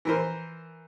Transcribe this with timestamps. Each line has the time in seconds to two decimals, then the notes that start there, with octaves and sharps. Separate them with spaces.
0.05 E3 A#4 C5